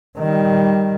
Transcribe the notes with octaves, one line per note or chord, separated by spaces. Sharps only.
D#3 G3